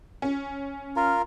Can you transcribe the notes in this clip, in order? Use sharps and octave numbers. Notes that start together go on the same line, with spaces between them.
C#4
F4 A#4